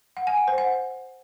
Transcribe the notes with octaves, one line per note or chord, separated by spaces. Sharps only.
F#5
G#5
F#5
C5
F#5